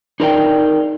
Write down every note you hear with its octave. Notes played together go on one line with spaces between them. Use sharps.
D#4 G#4 A#4 D5 F#5 G5